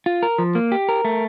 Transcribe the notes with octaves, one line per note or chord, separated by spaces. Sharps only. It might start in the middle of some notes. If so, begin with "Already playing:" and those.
F4
A#4
F3
A#3
G4
A#4
A3